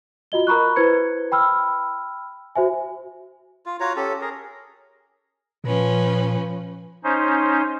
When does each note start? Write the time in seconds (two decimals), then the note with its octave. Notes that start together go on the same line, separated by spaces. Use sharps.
0.32 F4 F#4 D#5 G7
0.47 A#4 A#5 B5 C#6 F#6
0.76 E4 B4 C5 G#6 C#7
1.32 G5 B5 E6 F6
2.56 F#4 C5 E5 G#5
3.66 F4
3.80 F4 F#4 C#5 A#5
3.96 C#4 G4 A4
4.21 G#4 A#4
5.64 A#2 F3 C#4 B4
7.04 C#4 D#4 C5